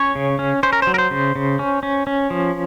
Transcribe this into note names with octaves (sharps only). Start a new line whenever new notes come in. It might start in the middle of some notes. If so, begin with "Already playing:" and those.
Already playing: C#4 C#5
C#3
C#4
C#4 C5
A#4
F#3 C5
A#4
C5
C#3
C#3
C#4
C#4
C#4
F3